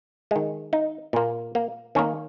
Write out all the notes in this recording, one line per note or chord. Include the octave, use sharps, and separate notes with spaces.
D#3 G#3
D#4
A#2 A#3
A#3
D#3 A#3 C#4